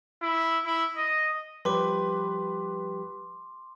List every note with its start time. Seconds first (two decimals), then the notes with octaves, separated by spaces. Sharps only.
0.22 E4
0.65 E4
0.96 D#5
1.65 F3 G3 G4 B4 C6 D6